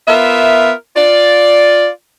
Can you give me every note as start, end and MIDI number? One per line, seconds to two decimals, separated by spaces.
0.08 0.72 59
0.08 0.72 65
0.08 0.72 70
0.08 0.72 76
0.97 1.89 65
0.97 1.89 74